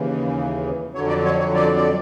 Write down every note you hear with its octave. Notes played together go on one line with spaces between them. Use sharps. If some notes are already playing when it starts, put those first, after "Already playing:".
Already playing: D#2 C#3 E3
F2 D3 F#3 C#5
D5
C#5
C#5
D5
D5